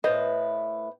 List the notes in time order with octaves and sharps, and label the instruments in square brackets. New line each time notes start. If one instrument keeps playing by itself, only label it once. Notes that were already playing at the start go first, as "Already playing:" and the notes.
[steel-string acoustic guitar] A2 A3 B4 [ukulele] C5 D#5